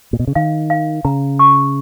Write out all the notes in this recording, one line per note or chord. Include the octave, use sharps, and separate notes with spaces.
A#2
B2
C#3
D#3 F5
F5
C#3 A#5
C#6